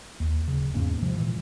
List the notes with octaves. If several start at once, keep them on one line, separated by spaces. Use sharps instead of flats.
D#2
D1 C#3
E2 G#2 A#3 C#4
C3 F3 G#3
A#2 E3 G#3